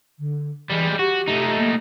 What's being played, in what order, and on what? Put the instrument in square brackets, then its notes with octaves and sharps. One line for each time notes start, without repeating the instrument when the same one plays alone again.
[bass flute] D3
[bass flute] E3 [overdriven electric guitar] G3 G#3
[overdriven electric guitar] F#4 [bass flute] G4
[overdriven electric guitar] A3 D#4
[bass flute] A#3